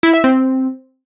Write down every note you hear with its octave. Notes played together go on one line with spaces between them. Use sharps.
E4
E5
C4